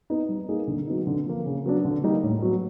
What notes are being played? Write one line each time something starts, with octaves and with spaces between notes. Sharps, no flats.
B3 D#4
G3
A#3 D#4 G#4
D3
F#3 B3 D#4
D3
F3 A#3
C#3
F#3 B3 D4
D3
G3 A#3 D#4
A2
F#3 B3